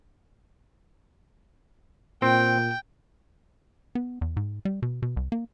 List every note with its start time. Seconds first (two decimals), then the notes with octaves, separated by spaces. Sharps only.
2.22 A#2 C4 G5
3.95 B3
4.21 E2
4.37 G#2
4.65 G3
4.82 B2
5.02 B2
5.17 C2
5.32 A#3